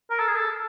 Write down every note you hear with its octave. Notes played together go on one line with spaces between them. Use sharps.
A#4
A4
G#4
A4